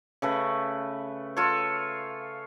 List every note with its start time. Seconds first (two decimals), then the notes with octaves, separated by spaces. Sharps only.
0.22 C#3 A3 B4
1.36 F4 A4 C#5